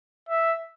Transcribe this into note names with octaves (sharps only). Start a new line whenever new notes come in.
E5